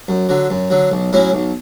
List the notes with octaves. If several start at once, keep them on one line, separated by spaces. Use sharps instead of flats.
F#2
D3 F#3
F#2
D3 F#3
B1
A2 F#3 C#4 E4
B1